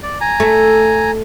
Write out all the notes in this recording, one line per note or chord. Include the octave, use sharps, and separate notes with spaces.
D5
G#5 A#5
A3